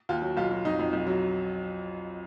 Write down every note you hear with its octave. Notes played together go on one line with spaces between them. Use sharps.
D#2 F4
F#3
B1 F4
F#3
F2 D#4
F2
B1
F#3